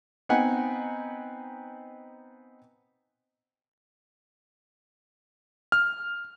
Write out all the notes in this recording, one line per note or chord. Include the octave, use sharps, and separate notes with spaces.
B3 C4 D#4 F#5 G#5
F6